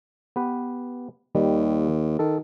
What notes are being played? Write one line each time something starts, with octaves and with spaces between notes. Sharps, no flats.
B3 G4 B4
D#2 D#3 G3
D#3 A4